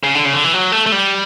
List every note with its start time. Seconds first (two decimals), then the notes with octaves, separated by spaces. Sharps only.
0.03 C#3
0.15 D3
0.25 C#3
0.33 D3
0.44 E3
0.54 F#3
0.72 A3
0.86 A3
0.92 G3